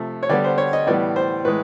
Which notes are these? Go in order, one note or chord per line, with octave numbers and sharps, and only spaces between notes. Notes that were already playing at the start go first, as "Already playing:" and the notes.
Already playing: C3 F3 A3
C#5
D3 G3 B3 D5
C5
C#5
D#5
A2 E3 G3 B3 D5
C5
A2 E3 G#3 B4